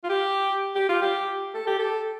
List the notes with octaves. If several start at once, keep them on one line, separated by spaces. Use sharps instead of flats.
F4
G4
G4
F4
G4
A4
G4
A4